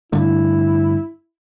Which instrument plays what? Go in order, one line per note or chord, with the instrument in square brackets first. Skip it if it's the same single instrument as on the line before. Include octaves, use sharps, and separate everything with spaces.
[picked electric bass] G2 D3 A3 [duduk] E4